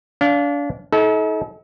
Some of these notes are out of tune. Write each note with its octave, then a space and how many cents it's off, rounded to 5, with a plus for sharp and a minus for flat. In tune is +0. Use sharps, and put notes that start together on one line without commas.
D4 -30 F5 +0
D#4 +40 A4 -35